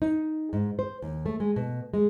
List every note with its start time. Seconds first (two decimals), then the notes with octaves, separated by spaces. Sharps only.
0.02 D#4
0.53 G#2
0.79 C5
1.02 D#2
1.26 A3
1.40 G#3
1.56 B2
1.94 G#3